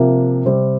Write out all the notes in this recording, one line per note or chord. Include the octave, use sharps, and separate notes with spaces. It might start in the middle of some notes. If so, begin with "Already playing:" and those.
Already playing: C3 F3 A#3
C3 G3 C4